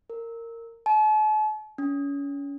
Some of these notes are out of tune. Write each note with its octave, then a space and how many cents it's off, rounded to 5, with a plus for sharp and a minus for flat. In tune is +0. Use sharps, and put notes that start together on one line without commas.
A#4 -20
A5 -45
C#4 +30